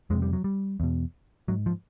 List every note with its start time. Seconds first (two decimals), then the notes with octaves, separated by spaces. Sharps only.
0.10 F2 C3 G#3
0.22 G3
0.33 F#3
0.44 G3
0.80 E2 B2
1.48 G#2 F#3
1.66 F3